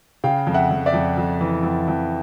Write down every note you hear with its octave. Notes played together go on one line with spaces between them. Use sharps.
C#3 F5 G5
F2
E5 F#5
F2
D5 E5
F2
F2
E3
F2
F2